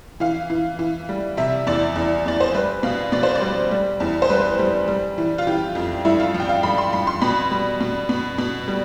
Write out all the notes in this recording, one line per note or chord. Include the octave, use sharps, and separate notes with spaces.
E3 F5
E3
E3
G3
C3 E5
E2 D5
E2
E2 D5
C5
G3 B4
B2 F5
B2 D5
C5
D5
G3
G3
E2
C5
G3 B4
G3
G3
E3
F4
E3 G4
F2
G2 E4
F4
F3
G5
F5
G2 B5
C6
G2 B5
C6
B2 B5
G3
B2
B2
B2
G3